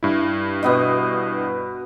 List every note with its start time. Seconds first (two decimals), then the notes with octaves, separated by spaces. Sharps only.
0.03 G2 E4
0.63 B2 B3 D#5